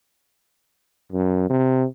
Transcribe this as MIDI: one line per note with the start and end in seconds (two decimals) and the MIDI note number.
1.12 1.49 42
1.50 1.86 48